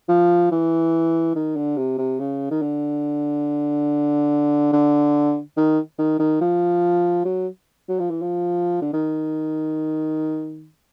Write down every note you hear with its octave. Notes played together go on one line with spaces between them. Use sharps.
F3
E3
D#3
D3
C3
C3
C#3
D#3
D3
D3
D#3
D#3
D#3
F3
F#3
F#3
F3
E3
F3
D3
D#3